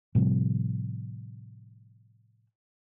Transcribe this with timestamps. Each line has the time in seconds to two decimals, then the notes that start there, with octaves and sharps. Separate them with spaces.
0.15 A2 C3 F3 G3